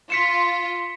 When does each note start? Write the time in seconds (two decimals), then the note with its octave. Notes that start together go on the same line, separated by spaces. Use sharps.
0.10 F4 B6 C#7 E7